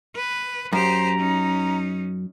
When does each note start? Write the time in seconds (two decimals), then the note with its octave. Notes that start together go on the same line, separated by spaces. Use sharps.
0.16 B4
0.73 F#2 G4 C5 A#5
1.19 C#4 D#4